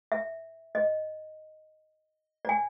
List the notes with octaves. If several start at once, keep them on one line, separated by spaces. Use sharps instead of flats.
E5
D#5
D5 G#5